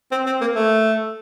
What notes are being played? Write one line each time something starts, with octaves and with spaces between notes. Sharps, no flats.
C4
C4
A#3
A3